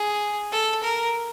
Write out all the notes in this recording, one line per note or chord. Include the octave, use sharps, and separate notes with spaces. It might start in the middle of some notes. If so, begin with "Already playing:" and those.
Already playing: G#4
A4
A#4